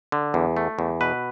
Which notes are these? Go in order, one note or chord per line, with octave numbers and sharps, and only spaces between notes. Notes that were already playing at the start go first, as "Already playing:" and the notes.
D3
E2
A3
E2
B2 B4